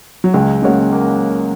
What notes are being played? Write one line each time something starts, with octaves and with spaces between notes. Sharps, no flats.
F#3
C#2 G#3
C#3 G#3 A#3 F#4 C#5
A#3